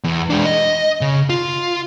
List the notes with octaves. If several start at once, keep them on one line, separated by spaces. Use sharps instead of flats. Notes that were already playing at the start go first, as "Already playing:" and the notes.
E2
G#3 D4
D#5
C#3
F4